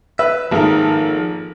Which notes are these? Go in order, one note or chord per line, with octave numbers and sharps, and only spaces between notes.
B4 E5
G#1 D#3 F3 A#3 A4 A#5